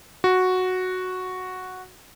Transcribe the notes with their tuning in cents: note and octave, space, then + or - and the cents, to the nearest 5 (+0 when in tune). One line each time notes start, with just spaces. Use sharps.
F#4 -5